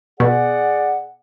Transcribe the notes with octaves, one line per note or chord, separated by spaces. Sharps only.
B2 G#4 D5 F#5